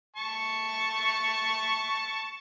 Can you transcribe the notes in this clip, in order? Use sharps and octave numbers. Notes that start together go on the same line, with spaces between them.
A5 C#6